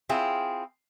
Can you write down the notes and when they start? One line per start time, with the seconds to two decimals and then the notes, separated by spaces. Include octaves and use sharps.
0.09 C4 E4 F4 G#4